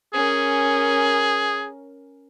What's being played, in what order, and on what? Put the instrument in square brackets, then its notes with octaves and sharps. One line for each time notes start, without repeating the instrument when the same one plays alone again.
[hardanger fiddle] C#4 A#4 [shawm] G#4